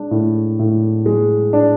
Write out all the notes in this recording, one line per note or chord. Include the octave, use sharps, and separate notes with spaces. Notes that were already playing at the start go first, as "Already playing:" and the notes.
Already playing: G#3 D4
A2
A2
G#3
D4